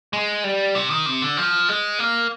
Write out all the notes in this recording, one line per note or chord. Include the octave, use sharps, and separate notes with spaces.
G#3
G3
C3
D#3
C3
D3
F3
G#3
A#3